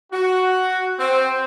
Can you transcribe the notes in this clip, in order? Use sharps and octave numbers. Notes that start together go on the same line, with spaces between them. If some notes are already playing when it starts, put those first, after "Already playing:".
F#4
C4